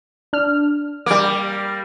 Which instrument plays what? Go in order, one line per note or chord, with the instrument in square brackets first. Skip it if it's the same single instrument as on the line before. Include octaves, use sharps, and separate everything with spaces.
[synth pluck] D4 F6
[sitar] G3 A#3 [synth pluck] D6